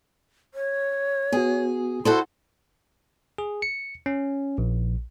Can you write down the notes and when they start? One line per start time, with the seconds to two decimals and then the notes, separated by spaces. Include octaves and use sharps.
0.54 C#5
1.32 B3 F#4 G#4
2.05 E4 F#4 A4 C5
3.38 G#4
3.62 C#7
4.06 C#4
4.58 A#1